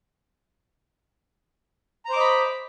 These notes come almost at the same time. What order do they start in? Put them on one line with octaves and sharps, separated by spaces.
A#5 C5 D6 D#5 B5